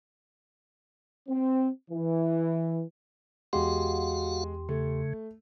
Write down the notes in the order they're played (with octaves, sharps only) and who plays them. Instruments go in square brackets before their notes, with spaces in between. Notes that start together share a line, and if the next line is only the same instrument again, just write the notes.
[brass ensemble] C4
E3
[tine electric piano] E2 G4 C6 [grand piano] G#3 [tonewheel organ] F#4 F5 F#5
[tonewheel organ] C#3 [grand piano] A3